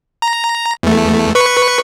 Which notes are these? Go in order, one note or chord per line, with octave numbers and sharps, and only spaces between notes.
A#5
E2 A3
B4 C#6 C#7